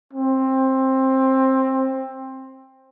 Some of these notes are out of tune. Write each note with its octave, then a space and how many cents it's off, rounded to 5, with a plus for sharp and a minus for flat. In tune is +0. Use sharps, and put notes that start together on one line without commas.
C4 +15